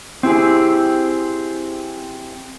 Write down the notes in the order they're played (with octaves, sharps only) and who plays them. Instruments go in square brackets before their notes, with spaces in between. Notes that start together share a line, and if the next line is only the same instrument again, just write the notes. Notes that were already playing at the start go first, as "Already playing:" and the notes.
[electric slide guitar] C4 E4 G4 G#4